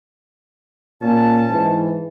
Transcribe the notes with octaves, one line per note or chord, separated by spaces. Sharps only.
A#2 C#4 A5
G#2 E3